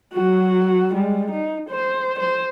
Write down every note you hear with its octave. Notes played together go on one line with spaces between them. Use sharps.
F#3 F#4
G3 G#3
D#4
C5
C5